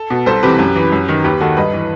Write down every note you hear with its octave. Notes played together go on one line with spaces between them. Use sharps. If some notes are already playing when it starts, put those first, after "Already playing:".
Already playing: A4
B2
C2 A4 C5
C3 E3 G4 B4
F#2
E3
F#2
D#3
D#2 G4 B4
D#3 F#4 A4
G2 B4 D#5
E3